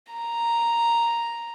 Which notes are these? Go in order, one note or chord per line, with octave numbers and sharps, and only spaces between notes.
A#5